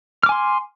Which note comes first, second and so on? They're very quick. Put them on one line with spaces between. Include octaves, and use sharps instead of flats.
F6 D6 G#5 C6